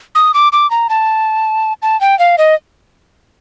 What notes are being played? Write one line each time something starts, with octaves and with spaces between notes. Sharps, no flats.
D#6
D6
D6
A#5
A5
A5
G5
F5
D#5